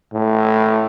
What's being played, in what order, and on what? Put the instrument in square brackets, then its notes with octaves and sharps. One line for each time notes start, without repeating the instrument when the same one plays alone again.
[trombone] A2